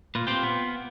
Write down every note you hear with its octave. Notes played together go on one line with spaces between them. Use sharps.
A#2 F4 B4
C4 G4
B3